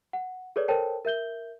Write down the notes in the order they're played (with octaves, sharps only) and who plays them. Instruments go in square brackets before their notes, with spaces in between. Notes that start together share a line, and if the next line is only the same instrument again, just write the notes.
[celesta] F#5
G#4 A4 B4 C#5 D5
A4 A#4 C5 C#5 G5 A5
A#4 E5 G6 G7